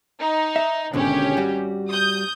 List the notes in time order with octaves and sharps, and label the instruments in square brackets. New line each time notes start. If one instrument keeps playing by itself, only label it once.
[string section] D#4
[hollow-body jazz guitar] E5
[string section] G#1 C#4 G4 [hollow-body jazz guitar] B2 D3
[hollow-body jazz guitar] G3 F#4
[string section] D#6 G6